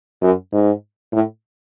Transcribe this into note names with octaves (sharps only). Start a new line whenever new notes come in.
F#2
G#2
A2